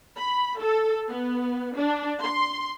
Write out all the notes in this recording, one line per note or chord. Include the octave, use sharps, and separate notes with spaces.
B5
A4
B3
D4
C6